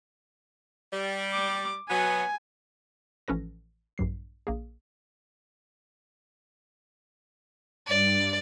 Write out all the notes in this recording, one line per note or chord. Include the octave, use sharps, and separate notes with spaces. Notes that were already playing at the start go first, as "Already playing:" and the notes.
G3
D6
B2 F#3 B3 G#5
A1 F3 C#4 A4 B4 A#6
A#1 G2 F#3 C7
A#1 A#3 G#4
G2 D5